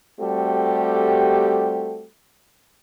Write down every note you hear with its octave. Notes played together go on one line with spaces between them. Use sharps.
G3 A3 C4 F#4 G4 A4